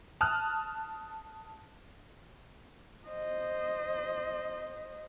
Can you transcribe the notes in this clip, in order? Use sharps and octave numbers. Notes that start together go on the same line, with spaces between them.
A5 D#6 F6 F#6
C5 D#5